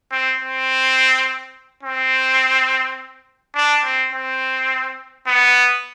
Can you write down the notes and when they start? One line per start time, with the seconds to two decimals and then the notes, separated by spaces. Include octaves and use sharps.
0.12 C4
0.40 C4
1.83 C4
3.55 D4
3.84 C4
4.13 C4
5.27 B3